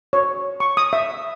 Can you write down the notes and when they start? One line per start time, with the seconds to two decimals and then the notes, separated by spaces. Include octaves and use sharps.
0.13 C#5
0.60 C#6
0.77 D#6
0.93 E5